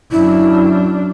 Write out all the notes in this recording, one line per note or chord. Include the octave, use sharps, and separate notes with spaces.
F#2 D4 E4